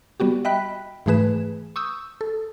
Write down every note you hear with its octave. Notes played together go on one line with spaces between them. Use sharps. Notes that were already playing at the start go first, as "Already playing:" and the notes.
G3 B3 F#4 G4
D#5 E5 G5 B5 F#6 B6
G#2 E3 A3 G#4 B4 E7
C#6 D#6 E6 G6
A4